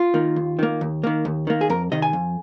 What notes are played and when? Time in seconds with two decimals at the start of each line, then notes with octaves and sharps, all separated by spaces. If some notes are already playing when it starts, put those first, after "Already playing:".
Already playing: F4
0.14 D#3 A#3
0.36 D#2
0.59 D#3 A#3
0.81 D#2
1.04 D#3 A#3
1.25 D#2
1.47 D#3 A#3
1.61 G#4
1.70 F2 A#4
1.92 C3 D#3 D#5
2.02 G#5
2.13 F2